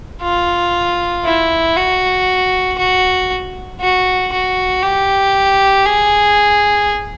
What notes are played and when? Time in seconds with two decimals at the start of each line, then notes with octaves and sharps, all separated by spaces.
0.22 F4
1.25 E4
1.76 F#4
2.78 F#4
3.81 F#4
4.32 F#4
4.83 G4
5.85 G#4